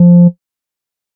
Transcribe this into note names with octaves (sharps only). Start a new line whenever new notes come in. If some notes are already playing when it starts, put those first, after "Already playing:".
Already playing: F3